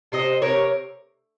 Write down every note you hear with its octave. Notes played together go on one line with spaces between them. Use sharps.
C3 C5 D#5
C3 A#4 C#5